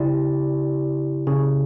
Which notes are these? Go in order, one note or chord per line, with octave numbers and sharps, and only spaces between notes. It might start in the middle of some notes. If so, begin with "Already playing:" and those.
Already playing: C#3 E4 G4 D5
C#3